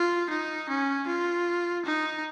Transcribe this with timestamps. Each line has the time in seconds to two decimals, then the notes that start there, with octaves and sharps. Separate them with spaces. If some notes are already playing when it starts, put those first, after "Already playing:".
Already playing: F4
0.29 D#4
0.69 C#4
1.07 F4
1.85 D#4